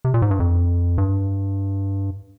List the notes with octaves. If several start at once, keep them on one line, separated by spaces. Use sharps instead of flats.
C3
A#2
G#2
G2
F2
G2